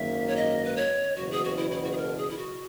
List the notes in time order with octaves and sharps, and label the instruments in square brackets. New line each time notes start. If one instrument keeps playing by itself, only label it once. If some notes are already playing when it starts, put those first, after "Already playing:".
Already playing: [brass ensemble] G#1 F#2 D#3 A#3 [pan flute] E5
[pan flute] C#5
D#5
B4
C#5
[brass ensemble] F#1 E2 B2 [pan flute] F#4
[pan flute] G#4
F#4
E4
E4
F#4
G#4
A#4
G#4
E4
F#4